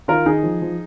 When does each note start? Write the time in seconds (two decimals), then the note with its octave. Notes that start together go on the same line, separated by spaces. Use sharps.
0.08 D#3 F4 A#4
0.26 D#3 D#4 G#4
0.43 F3
0.62 F3